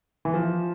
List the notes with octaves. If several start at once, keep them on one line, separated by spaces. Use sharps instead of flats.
E3
F3